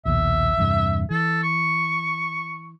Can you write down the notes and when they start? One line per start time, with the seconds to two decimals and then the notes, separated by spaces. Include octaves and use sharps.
0.06 A#1 D#2 B2 E5
0.57 E2 G2 C3
1.10 E3 A4
1.43 C#6